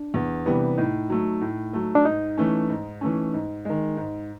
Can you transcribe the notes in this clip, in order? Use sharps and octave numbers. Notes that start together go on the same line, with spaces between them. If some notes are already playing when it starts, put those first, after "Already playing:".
Already playing: D4
E2
C3 E3 G3 B3
A2 D#4
F#3 A3
A2
F#3 A3
D4
G#2 D#4
E3 A3 C#4
G#2
E3 A3 C#4
G#2
D#3 G#3
G#2